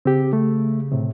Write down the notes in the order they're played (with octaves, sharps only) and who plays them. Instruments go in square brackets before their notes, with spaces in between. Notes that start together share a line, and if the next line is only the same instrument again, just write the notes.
[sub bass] C#3 [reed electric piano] C4 G4
[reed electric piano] A3
A2 C3